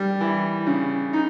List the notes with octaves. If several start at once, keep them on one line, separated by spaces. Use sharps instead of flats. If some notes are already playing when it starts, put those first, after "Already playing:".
Already playing: G3
E3
C#3
D#4